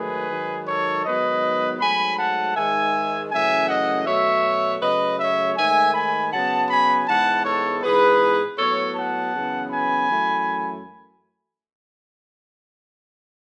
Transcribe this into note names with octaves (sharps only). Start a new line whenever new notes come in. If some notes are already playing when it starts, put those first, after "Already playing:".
Already playing: G#2 D#3 F#3 A3 G#4 B4
G#2 D#3 F#3
A4 C#5
G#2 D#3 F#3 B3 B4 D#5
G#2 F#3 A3 G#5 B5
F#5 A5
G#2 D#3 G#3 E5 G#5
F#2 C#3 E3 A3 E5 G#5
D#5 F#5
B2 F#3 A3 C#5 E5
C#3 F#3 A3 B4 D#5
C#5 E5
G#2 D#3 A3 E5 G#5
G#5 B5
C#3 F#3 B3 F#5 A5
G#5 B5
G#2 E3 G#3 B3 F#5 A5
A4 C#5
G#2 E3 B3 G#4 B4
A2 F#3 B3 A4 C#5
F#5 A5
F#2 C#3 E3 B3
G#5 B5
F#2 E3 A3